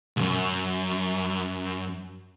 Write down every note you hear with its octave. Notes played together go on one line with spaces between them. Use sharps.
C2 F#2